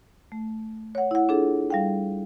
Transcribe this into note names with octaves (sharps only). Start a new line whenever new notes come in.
A3
C#5 F#5
E4 F#5
D4 F4 G#4 A4
G3 F5 G5